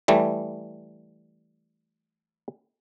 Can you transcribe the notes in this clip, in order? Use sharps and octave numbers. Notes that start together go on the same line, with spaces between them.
E3 G3 A3